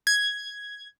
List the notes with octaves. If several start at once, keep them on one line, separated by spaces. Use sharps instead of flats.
G#6